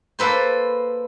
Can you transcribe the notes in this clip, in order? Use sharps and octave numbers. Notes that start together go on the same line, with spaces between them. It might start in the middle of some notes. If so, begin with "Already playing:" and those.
A#3 A4 B4 C5